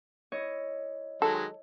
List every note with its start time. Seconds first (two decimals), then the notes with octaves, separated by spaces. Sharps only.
0.32 E4 C#5 D#5
1.22 D#3 F#3 G#3 A4